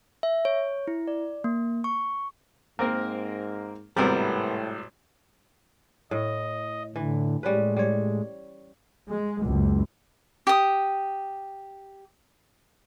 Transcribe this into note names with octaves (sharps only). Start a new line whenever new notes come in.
E5
C#5
E4
D5
A#3
C#6
G#2 A#3 C4 A#4
G#1 A2 C3 G3 B3 C4 A#4
A2 D#5
A2 D3 E3
A2 G3 G#3 C#4 B4
G3 C#5
G#3
F#1 C#2
G4 D#6